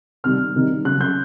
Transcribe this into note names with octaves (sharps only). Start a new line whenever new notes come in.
C3 D#3 G3 F6
C3 D#3 G3
C#3 F#3 F#6
G6